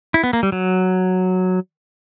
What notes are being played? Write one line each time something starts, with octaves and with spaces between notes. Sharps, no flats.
E4
B3
A#3
G3
F#3